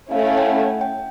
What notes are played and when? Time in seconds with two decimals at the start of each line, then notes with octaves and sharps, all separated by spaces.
0.11 A3 C#4 E4 F5
0.19 E5
0.27 F5
0.38 G5
0.46 F#5
0.81 G5